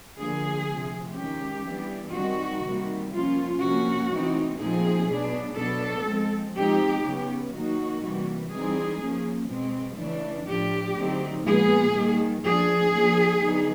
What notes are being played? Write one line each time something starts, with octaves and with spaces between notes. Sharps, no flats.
D3 F3 A#3 G#4
C3 F3 A3
D#3 G#3 C#4 G4
E3 G3 B3 D4
D#3 G3 C4 D#4 F#4
C3 D#3 G3 A#3
F3 A#3 C#4 F4
C3 F3 A#3 C#4 F#4
E3 A3 C4 D#4
A#2 F3 A3 C4 D#4 G#4
B2 F#3 B3 D4
B2 F#3 B3 D4 A4
F3 G#3 C4
F3 G#3 C4 D#4 G4
C#3 F#3 B3
D#3 F#3 A#3 D#4 F#4
C3 E3 G3 A#3
E3 G3 C4 D#4 G#4
F3 A#3 C#4
B2 G#3 C4
C#3 E3 A3 D4
A2 F3 A3 D4 G4
D3 F#3 A3 C4 D#4
A#2 F3 G#3 B3 G#4
D#3 G3 A#3
F3 A3 D4 G#4
F3 A#3 D4
D3 F#3 B3 D#4